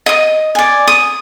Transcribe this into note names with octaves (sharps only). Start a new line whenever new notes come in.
D#5 D#6
D5 G#5
D#6